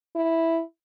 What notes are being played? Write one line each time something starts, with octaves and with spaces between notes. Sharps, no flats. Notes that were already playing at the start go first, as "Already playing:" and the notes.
E4